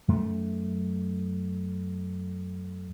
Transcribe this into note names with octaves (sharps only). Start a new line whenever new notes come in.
F#2 A3